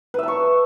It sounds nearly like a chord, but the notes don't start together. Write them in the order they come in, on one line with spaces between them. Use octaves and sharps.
B4 E5 A5 C#6